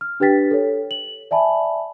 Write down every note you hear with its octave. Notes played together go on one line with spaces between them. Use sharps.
F6
D4 G4 B4 G5 A6 B6
A4 C#5
F#7
D5 E5 G#5 A5 B5